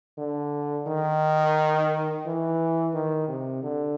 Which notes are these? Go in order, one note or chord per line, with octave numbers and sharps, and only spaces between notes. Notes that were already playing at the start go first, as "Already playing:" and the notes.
D3
D#3
E3
D#3
C3
D3